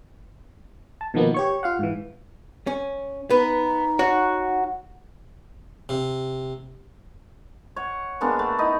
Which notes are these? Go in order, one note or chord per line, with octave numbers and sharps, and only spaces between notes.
A5
B2 D#3 F3 A#3 B3 D#4
G4 C#5 C#6
F4 F5 F#5
G#2 E3
C#4
B3 D#4 B4
F#4 C#5
C3
C#5 F#5
G#3 A#3 B3 D4
A3
D#4 E4 D#5